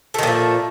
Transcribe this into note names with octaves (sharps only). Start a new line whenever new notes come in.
A#2 D#3 F3 A3